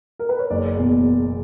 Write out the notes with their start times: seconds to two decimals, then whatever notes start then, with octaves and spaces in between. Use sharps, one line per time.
0.19 A#4
0.29 B4
0.39 C#5
0.50 F#1 D5
0.77 E2 B2